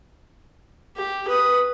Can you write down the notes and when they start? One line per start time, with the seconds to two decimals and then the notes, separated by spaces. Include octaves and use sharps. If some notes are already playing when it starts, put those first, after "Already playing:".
0.97 G4
1.28 B4 D#6